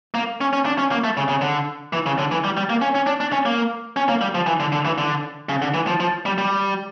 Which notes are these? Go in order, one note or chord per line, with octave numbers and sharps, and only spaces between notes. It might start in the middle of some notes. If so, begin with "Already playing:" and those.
A#3
C#4
C#4
D4
C#4
A#3
A3
C#3
C#3
D3
E3
C#3
D3
E3
G3
G3
A#3
C#4
C#4
D4
D4
C#4
A#3
C#4
A#3
G3
F3
E3
D3
D3
E3
D3
C#3
D3
E3
F3
F3
G3
G3